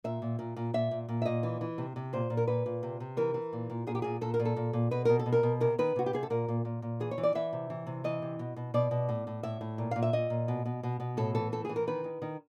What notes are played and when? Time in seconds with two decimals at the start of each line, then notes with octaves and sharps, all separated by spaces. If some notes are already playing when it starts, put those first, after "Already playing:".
0.04 A#2 E5
0.22 A#2
0.39 A#2
0.56 A#2
0.74 A#2 E5
0.91 A#2
1.09 A#2
1.22 E5
1.25 A#2 D#5
1.43 E3
1.61 E3
1.78 C3
1.96 C3
2.13 A#2 C5
2.30 A#2
2.37 A#4
2.47 A#2 B4
2.66 A#2
2.83 C3
3.00 C3
3.17 E3 A#4
3.34 E3
3.53 A#2
3.70 A#2
3.87 A#2 G#4
3.95 G4
4.02 A#2 G#4
4.21 A#2 A4
4.34 A#4
4.40 A#2
4.45 A4
4.56 A#2
4.73 A#2
4.91 B2 B4
5.05 B2 A#4
5.19 A4
5.26 B2
5.32 A#4
5.43 B2
5.60 C3 A#4
5.78 D#3 B4
5.96 C3 F#4
6.06 G4
6.13 C3 G#4
6.23 A4
6.30 A#2 A#4
6.48 A#2
6.65 A#2
6.82 A#2
7.00 E3 G#4
7.11 C#5
7.18 E3
7.23 D5
7.35 E3 E5
7.53 C3
7.70 E3
7.87 C3
8.04 E3 D#5
8.22 C3
8.39 B2
8.56 B2
8.74 B2 D5
8.91 B2
9.09 A2
9.27 A2
9.43 A2 E5
9.61 A2
9.78 A#2
9.91 A#2 F5
10.03 E5
10.13 A#2 D#5
10.30 A#2
10.48 B2
10.65 B2
10.83 B2
11.00 B2
11.17 A2 A4
11.35 E3 A4
11.52 A2 A4
11.65 G#4
11.69 E3
11.76 A#4
11.87 D#3 B4
12.04 D#3
12.22 D#3